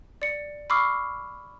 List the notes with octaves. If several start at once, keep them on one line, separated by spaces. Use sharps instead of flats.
D5 C#7
B5 C#6 D6 E6 F6 C7